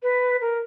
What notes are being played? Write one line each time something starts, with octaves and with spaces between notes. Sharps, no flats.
B4
A#4